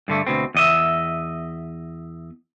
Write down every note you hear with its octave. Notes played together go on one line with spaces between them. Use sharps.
G2 D3 A3
D2 B2 C4
E2 D#5 E5